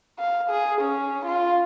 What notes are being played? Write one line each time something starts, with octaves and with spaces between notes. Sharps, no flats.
F5
G#4
C#4
F4